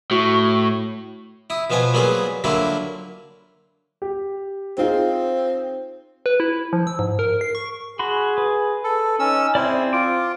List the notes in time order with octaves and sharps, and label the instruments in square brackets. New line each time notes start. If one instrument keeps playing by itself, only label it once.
[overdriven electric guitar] A2 [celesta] F#4 C#6
[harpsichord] E4 D#6
B2 F3 B3 F4 G#5 D#6
F#3 G3 A#3 B3 F4 G#4
D3 F#3 G3 A#3 E4 F4
[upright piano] G4
[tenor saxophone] C4 [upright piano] D#4 F4 G#4
[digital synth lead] B4
E4
F3
E6
G#2
A#4
C7
C#6
[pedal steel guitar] F#4 B5 C6 [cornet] G#4
[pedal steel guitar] B4
[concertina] A4
[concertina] C#4 E6 [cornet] D#4
[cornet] C4 [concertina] E4 [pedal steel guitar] G#4 C5 D5
[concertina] F4 [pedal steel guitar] D6